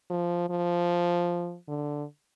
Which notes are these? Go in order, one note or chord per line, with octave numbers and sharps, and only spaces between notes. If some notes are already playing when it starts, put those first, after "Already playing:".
F3
F3
D3